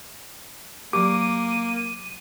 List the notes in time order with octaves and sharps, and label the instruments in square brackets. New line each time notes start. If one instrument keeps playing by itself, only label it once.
[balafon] F#3 G4 [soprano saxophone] A#3 [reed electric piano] D6 [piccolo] D#7